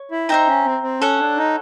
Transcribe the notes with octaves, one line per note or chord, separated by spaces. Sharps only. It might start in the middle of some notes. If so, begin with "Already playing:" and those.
Already playing: C#5
E4
D#4 C5 E5 G5 A#5
C#4
C4
C4
C#4 A4 C#5 F#5
D4
D#4